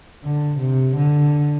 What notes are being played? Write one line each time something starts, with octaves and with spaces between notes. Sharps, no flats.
D3
C3
D3